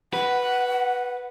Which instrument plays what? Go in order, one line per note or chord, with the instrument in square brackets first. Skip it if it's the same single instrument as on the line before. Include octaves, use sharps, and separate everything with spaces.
[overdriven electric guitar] B4 [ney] F#5